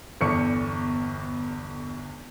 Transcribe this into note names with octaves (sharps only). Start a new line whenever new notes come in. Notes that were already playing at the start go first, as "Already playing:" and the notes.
G1 E2 A4 D5 C#6 C#7